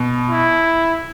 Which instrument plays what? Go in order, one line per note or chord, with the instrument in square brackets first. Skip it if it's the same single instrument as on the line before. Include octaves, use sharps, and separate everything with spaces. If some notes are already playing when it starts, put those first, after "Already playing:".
Already playing: [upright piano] B2
[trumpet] E4